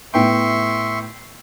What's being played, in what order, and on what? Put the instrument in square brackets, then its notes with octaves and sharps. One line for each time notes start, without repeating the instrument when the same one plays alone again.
[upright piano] A2 B3 G5 [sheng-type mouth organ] E5 C6 C#6